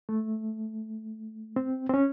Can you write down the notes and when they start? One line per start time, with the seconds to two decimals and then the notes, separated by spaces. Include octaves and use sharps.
0.09 A3
1.56 C4
1.90 C4
1.94 C#4